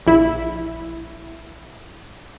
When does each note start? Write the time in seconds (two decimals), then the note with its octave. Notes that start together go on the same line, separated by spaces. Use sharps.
0.07 A#1 E4